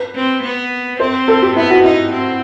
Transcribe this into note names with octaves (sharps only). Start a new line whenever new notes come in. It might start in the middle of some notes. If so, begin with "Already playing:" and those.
Already playing: B4
C4
B3
C4 C5
A4
G4
B3 E4
F#4
D#4 E4
C4